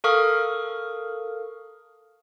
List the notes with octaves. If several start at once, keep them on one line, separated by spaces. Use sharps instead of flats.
A4 A#4 F5 C#6 D#6 F6